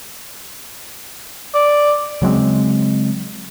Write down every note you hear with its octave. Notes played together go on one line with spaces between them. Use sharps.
D5
C#3 F#3 G#3 C4